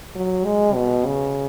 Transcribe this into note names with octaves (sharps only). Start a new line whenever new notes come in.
F#3
G#3
B2
C#3